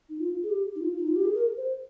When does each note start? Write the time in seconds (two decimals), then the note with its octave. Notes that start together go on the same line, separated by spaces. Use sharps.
0.09 D#4
0.19 F4
0.43 G#4
0.50 G4
0.75 D#4
0.81 F4
0.98 D#4
1.07 F4
1.16 G4
1.25 G#4
1.34 A#4
1.57 C5